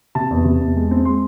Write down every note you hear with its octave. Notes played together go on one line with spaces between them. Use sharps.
C3 A5
E2
C3
E2
G#3
C4
G#3 C6